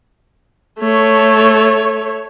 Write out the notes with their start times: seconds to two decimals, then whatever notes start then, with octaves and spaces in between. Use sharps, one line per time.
0.80 A3 C#5